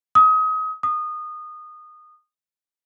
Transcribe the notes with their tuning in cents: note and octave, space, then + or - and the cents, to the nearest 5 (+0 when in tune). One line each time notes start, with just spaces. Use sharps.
D#6 +30
D#6 -20